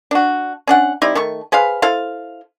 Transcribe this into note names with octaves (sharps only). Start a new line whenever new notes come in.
D4 F#4
C#4 D4 F#5
G3 C4 D#4 E4
D#3 A3 C#6
G#4 B4 C5 F5
E4 A4 C5 F5